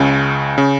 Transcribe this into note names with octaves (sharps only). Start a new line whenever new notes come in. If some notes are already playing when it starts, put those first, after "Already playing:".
Already playing: C#2 C#3
C#3